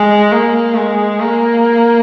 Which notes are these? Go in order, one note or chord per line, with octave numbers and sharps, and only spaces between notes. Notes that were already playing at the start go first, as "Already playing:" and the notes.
Already playing: G#3
A#3
G#3
A#3